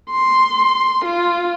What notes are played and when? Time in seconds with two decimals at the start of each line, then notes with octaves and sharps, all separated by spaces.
0.11 C6
1.05 F4